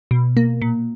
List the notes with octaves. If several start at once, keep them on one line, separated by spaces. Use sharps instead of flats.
B2
A#3
A#2